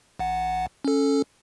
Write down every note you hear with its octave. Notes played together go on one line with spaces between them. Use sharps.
A1 F#5
C#4 A4